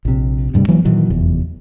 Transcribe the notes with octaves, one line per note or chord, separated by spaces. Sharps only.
A#1 C3
D2 G2 C3 G3
E3 F#3 G#3 A#3
A#2 D#3 E3 F#3
F1 E2